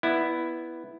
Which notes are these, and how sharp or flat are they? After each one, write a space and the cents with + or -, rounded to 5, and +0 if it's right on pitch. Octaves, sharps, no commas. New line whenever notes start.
B3 +0 E4 +5 D5 +30